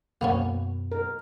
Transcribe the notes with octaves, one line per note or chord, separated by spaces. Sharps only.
F#2 B2 A#3 B3 C#4
A#4